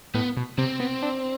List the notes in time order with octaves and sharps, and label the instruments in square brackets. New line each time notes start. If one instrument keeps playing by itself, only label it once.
[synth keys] A2 [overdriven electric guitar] B3
[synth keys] B2
[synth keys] C3 [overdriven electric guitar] C4
[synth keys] B3
D4